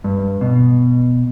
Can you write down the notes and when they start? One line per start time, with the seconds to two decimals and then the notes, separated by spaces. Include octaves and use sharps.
0.04 G2
0.41 B2